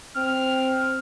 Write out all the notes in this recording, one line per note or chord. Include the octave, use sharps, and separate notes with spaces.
C4 F6